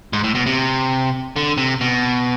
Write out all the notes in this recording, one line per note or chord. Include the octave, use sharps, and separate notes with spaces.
G#2
A2
B2
C3
D3
C3
B2